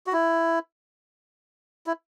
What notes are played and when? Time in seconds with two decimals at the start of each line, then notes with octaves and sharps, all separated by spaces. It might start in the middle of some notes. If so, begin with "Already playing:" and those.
0.07 F#4
0.13 E4
1.87 E4